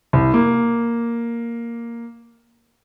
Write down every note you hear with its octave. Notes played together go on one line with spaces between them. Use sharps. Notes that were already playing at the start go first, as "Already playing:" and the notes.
C2
A#3